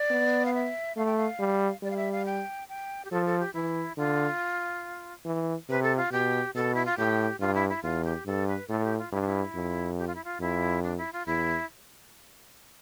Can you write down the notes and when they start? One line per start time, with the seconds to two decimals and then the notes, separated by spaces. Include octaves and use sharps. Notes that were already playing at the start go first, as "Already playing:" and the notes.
Already playing: D5
0.10 B3
0.45 F5
0.54 E5
0.97 A3 F5
1.06 G5
1.17 F5
1.39 G3
1.83 G3 D5
1.90 F5
1.96 E5
2.12 F5
2.25 G5
2.69 G5
3.05 G4
3.11 F3 A4
3.26 A4
3.40 G4
3.54 E3 E4
3.98 D3 F4
5.26 E3
5.69 C3 B4
5.83 A4
5.97 F4
6.11 B2 G4
6.55 B2 A4
6.75 E4
6.85 F4
6.97 A2 G4
7.40 G2 F4
7.55 E4
7.69 E4
7.83 E2 F4
8.04 G4
8.26 G2 A4
8.48 B4
8.69 A2 A4
8.84 G4
8.98 F4
9.12 G2 E4
9.20 D4
9.27 E4
9.55 F2
9.98 G4
10.07 F4
10.15 E4
10.24 F4
10.40 F2 E4
10.83 D4
10.97 E4
11.13 F4
11.26 E2 E4